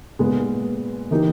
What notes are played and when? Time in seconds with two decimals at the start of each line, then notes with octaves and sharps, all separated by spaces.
0.19 A#2 G#3 B3
1.11 E3 A#3 D#4 G4